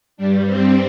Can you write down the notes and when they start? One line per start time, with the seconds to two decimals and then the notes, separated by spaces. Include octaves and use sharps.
0.17 G2 G3 D4
0.46 C4